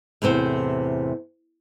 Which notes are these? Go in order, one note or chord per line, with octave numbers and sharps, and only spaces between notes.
E2 A2 C3 C5